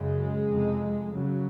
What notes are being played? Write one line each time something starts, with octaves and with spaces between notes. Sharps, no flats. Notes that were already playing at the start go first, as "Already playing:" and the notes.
Already playing: F#2 C#3 G#3
F2 C3
F#2 C#3 F#3